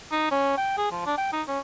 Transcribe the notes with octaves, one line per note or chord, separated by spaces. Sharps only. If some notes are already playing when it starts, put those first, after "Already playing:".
D#4
C#4
G5
G#4
F3
D4
G5
D#4
C#4